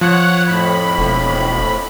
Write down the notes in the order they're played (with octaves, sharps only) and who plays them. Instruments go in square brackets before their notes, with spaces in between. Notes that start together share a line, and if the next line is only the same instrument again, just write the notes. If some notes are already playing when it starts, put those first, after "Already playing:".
[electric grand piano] F3 [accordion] C#5 F#5 F#6
[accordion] F2 A2 B5
[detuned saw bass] E1